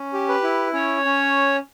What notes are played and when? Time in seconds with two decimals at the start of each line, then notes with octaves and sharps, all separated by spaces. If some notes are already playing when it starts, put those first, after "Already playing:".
Already playing: C#4
0.13 G4
0.29 B4
0.44 E4
0.73 C#4 C#5
1.05 C#4